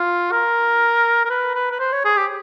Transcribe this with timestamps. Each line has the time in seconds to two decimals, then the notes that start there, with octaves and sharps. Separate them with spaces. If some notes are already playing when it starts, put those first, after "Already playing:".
Already playing: F4
0.32 A#4
1.25 A#4
1.30 B4
1.55 B4
1.71 B4
1.79 C5
1.92 C#5
2.05 G#4
2.16 G4